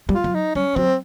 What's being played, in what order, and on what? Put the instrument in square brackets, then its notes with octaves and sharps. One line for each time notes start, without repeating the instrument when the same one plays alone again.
[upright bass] G3
[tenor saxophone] F4
[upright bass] F#3
[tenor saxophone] D#4
[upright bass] G3 [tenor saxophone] C#4
[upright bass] F#3 [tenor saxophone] C4